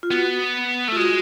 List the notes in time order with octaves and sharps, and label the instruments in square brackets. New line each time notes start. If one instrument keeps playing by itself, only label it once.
[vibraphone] F4
[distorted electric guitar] B3 [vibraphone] F#4
[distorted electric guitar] A3
[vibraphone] F4
[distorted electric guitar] G#3 [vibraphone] F#4